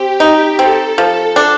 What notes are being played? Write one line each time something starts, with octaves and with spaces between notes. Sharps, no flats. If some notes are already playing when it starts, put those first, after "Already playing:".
Already playing: C4 G4
D#4
C4 A4
F3 A4
D4